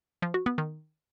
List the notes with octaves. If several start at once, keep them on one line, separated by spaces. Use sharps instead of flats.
F3
F#4
B3
D#3